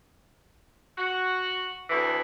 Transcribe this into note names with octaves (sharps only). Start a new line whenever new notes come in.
F#4
D2 E3